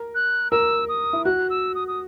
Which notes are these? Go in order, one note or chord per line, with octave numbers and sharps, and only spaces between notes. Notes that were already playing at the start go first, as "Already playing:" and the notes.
Already playing: A#4
F#6
A#4 E6
D#6
E4
F#4 F#6
E6
D#6
D#6